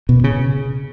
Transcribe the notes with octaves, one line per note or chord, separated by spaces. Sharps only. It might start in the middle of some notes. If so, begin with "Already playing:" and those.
B2
C#3